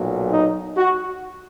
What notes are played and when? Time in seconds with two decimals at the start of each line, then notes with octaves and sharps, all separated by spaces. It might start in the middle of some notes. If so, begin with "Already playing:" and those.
Already playing: B1 A#2 F#3
0.30 D#4
0.76 F#4